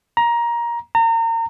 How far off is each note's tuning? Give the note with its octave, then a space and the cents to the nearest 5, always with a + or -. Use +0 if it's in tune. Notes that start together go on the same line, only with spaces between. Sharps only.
A#5 +15
A#5 -35